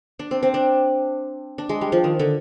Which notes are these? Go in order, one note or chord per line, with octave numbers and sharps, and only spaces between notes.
D4
C4
C4
D4
D4
G#3
G3
F3
D#3
D3